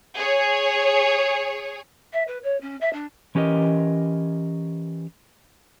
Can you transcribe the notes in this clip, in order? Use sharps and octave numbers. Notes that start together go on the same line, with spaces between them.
G#4 C#5
E5
B4
C#5
C#4
E5
D4
E3 C#4 G4 A#4 D#5